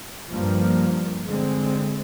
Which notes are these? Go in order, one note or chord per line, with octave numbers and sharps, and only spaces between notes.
G2 F3 A#3
D3 G#3 C4